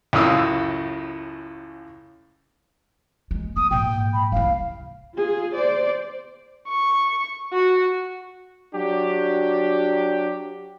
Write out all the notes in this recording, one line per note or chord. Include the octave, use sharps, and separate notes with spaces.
C#2 F#2 A2 F5 D#6 E6
F#1 G#3
B3 D#6
A#1 G#2 G5
B5
C2 E4 F5
F4 G#4
C5 D5
C#6
F#4
F#3 D4 F#4 G4